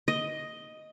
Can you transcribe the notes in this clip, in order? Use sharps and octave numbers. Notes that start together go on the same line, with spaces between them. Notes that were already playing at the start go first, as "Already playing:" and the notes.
D#5